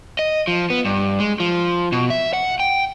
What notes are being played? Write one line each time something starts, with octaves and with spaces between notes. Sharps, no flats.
D#5
F3
B3
G2
G#3
F3
B2
E5
F#5
G5